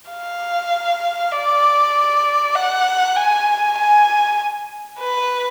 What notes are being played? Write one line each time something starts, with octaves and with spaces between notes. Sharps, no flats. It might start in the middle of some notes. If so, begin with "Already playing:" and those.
F5
D5
F#5
G#5
G#5
B4